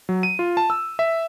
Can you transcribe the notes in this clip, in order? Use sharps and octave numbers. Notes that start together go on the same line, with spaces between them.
F#3
D#7
F4
A5
E6
E5